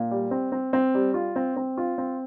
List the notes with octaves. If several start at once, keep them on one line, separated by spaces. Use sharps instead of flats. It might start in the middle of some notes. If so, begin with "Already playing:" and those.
Already playing: A#2
G3
C4
C4
C4
G3
F4
C4
C4
F4
C4